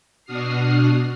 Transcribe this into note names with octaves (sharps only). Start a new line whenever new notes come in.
B2 D4 F#4 D#6 F6 C7